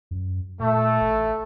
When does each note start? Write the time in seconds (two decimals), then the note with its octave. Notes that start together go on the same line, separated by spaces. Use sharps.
0.11 F#2
0.60 A#2 A3
1.01 A1